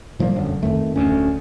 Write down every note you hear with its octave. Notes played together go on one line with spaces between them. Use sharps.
A#2 F3 G3 A#3
E1 F#2 D3
F2 D#3 A3
D1 D2 C#4